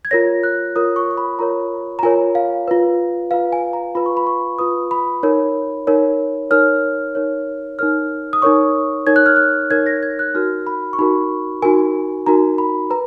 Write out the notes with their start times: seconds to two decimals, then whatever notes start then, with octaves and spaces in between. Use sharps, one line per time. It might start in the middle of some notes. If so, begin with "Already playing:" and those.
0.05 G#6
0.11 F4 A#4 C#5 A#6
0.43 F#6
0.76 F4 A#4 C#5 D#6
0.96 C#6
1.11 C#6
1.17 B5
1.39 F4 A#4 C#5 A#5
1.99 A#5
2.03 F4 A#4 C#5 G#5
2.35 F5
2.68 F4 B4
3.31 F4 B4 F5
3.53 G#5
3.73 A#5
3.95 F4 B4 B5
4.06 C#6
4.17 B5
4.27 C#6
4.59 F4 B4 D#6
4.91 B5
5.23 D#4 A#4 C#5
5.87 D#4 A#4 C#5
6.51 D#4 A#4 C#5 F6
7.15 D#4 A#4 C#5
7.79 D#4 A#4 C#5 F6
8.33 D#6
8.42 D#4 A#4 C#5 C#6
9.07 D#4 A#4 C#5 G#6
9.16 F#6
9.26 F6
9.36 F#6
9.71 D#4 A#4 C#5 G#6
9.86 A#6
10.03 G#6
10.19 F#6
10.34 D#4 F#4 A#4 F6
10.67 B5
10.93 C#6
10.99 D#4 F#4 A#4 B5
11.62 D#4 F#4 A#4 G#5
12.26 D#4 F#4 A#4 A#5
12.58 B5
12.90 B4 A#5